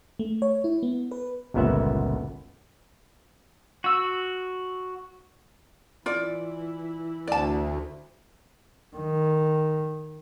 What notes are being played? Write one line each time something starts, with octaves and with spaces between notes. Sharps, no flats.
A3
C#5
E4
B3
B4
G1 C#2 A#2 B3 E5 F#5
F#4 E6
E3 E4 F4 D5
D2 D5 A5
D#3